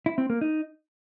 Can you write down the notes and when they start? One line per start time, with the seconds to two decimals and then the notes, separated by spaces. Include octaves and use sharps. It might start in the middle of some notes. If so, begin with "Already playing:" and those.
0.06 E4
0.18 C4
0.30 A#3
0.41 D#4